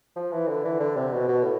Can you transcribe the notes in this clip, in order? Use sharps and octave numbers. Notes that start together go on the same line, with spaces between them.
F3
E3
D3
E3
D3
C3
B2
B2
A2